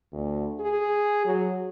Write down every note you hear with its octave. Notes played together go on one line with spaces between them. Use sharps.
D2
G#4
F#3